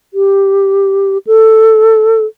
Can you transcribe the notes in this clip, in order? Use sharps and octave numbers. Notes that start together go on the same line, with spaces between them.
G4
A4